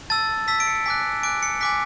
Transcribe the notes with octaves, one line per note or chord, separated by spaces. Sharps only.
A5 E6 A6
A5 E6 B6
D7
C#7
G#5 D6 F#6 B6
G#5 D6 F#6 D7
C#7
G#5 D6 F#6 B6